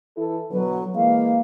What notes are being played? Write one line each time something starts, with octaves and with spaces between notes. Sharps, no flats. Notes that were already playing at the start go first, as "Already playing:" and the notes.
E3 E4 A4
B2 D3 F#3 B4
E3 G#3 A#3 F5